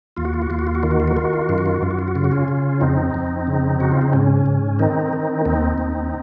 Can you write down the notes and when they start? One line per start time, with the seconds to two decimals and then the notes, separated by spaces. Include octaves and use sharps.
0.17 D#2 F4
0.25 F#4
0.34 F4
0.42 F#4
0.50 D#2 F4
0.59 F#4
0.67 F4
0.75 F#4
0.83 D#3 F4
0.91 F#4
1.00 F4
1.08 F#4
1.16 D#3 F4
1.25 F#4
1.33 F4
1.42 F#4
1.49 F#2 F4
1.58 F#4
1.66 F4
1.74 F#4
1.82 F#2 F4
1.91 F#4
1.99 F4
2.08 F#4
2.15 C#3 F4
2.24 F#4
2.31 C#4 F4
2.48 C#3
2.81 F2 C4 D#4
3.14 F2
3.47 C#3
3.80 C#3 F#4
3.92 F4
4.02 D#4
4.13 G#2 C#4
4.46 G#2
4.79 D#3 C4 D#4
5.13 D#3
5.45 D#2 C4 D#4
5.78 D#2